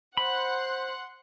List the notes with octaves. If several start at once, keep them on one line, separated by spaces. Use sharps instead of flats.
C5 F#5 B5 C6 F#6